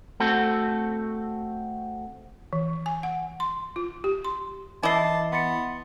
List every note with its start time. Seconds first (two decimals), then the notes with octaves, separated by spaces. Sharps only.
0.20 A3 C4 F#4 A4
2.53 E3
2.86 G#5
3.03 F#5
3.40 C6
3.76 F4
4.04 G4
4.25 C6
4.83 E3 E4 D#5 A5 D6 C7
5.32 B3 C6 A6 C#7